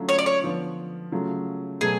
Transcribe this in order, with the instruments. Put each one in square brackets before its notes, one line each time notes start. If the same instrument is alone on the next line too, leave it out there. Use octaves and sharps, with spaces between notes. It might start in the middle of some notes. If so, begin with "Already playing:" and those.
Already playing: [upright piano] D3 F#3 A3 C#4 F4
[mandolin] C#5
D5
C#5
[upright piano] D3 F3 B3 F4
C#3 F#3 A3 F4
[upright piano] B2 F#3 A3 A4 [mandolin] G#4